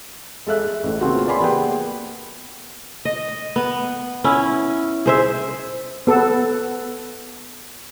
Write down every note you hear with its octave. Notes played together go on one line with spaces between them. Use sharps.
G#3 A4 E5 F#6
G#4
A1 A2
C#3 A#3 C4 F4 F#4 G#4
B4 C#5 D5 G#5 B5 C6
A#3 B3 G4 G#4 B4 G5
D#5
B3
C#4 E4
G#4 C5 E5
B3 A4